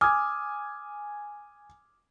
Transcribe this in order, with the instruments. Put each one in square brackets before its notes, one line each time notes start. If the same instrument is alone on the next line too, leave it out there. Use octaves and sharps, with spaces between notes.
[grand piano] G#5 G#6 [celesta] D6 D#6 F6